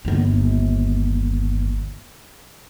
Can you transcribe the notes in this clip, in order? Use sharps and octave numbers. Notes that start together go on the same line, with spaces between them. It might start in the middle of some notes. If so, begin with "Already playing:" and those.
G1 D#2